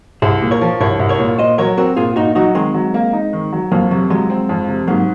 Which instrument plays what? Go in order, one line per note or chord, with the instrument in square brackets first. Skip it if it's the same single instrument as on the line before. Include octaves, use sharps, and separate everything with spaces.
[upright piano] C2 [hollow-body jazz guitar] G#4 C5
[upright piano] A#2
[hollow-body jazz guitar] A#4 C#5
[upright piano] F3
[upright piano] C2 [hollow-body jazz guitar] A#4 C#5
[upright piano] C2
[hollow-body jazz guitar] A#4 C#5
[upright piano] A#2
[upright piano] A#2 [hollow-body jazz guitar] C5 D#5
[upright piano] F#3 [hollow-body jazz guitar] A#4 C#5
[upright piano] C4 [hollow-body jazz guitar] F#4 A#4
[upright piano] A#2 [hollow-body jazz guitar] F4 G#4
[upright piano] A#2 [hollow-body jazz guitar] D#4 F#4
[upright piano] F#3 [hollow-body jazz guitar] D#4 F#4
[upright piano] D#3 [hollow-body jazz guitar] G#3 C4
[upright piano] F#3
A#3
D#4
D#3
F#3
[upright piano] F2 [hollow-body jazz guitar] F#3 A#3
[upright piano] C3 [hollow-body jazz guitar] F#3
[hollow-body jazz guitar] F3 G#3 [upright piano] F#3
[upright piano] C4
F2
C3
[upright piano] G#2 [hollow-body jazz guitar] F#3 A#3